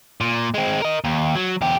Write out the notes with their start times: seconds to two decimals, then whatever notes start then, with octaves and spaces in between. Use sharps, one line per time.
0.21 A#2
0.54 G#3 C4
0.82 A#4 D#5
1.04 D#2
1.35 F#3
1.61 E2 G4